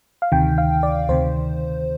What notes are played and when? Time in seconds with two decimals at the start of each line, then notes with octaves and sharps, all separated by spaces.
0.22 F5
0.32 D2 C3 D#3 G5
0.58 F5
0.83 D5
1.09 D2 C3 D#3 C5